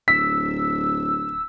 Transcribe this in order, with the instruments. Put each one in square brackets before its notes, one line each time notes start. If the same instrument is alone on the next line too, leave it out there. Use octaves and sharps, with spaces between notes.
[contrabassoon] D1 [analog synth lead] E6 [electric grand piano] B6